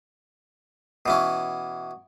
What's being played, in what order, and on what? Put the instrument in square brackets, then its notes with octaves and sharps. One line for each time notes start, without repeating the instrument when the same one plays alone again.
[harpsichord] B2 E3 C#4